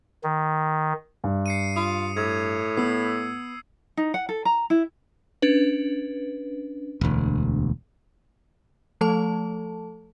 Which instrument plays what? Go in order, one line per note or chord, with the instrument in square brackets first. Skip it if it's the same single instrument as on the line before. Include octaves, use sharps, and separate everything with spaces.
[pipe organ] D#3
[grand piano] G2
[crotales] C7 C#7 D#7
[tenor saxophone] F4 [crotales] D#6
[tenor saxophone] A2 [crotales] G#6
[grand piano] B3 [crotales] E6 C7
[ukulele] D#4
F#5
A4
A#5
E4
[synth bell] C#4 D4 B4
[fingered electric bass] E1 D2
[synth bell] F3 A3 A4 A5